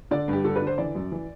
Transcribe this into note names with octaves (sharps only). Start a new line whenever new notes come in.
D3 D5
G2
G4
D3 A4
B4
D3
C5
E3 D5
F#2
E3